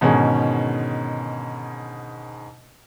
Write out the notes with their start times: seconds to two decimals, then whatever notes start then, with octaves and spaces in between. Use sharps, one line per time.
0.01 G#2 B2 D3 D#3 C#4 G#4